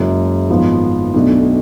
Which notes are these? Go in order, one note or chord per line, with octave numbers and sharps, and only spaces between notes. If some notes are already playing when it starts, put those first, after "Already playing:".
Already playing: F#1 F#2 C#3 G#3
G#1 G#2 F3 B3
B1 B2 A3 D4